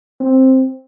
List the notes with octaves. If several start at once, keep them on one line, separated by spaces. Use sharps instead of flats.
C4